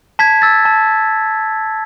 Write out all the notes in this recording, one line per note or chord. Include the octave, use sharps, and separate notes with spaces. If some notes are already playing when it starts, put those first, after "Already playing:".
A5 G#6 B6
E6 A6
A5